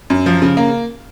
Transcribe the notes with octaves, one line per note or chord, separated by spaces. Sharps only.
F#2
F3
C#3
A#3